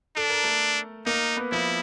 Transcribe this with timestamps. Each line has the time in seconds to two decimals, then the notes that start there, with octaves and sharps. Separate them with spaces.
0.16 D4 A4
0.30 A#4
0.43 A3 A4
1.06 A#3 D#4 A#4
1.36 B3 B4
1.51 F3 E4 F4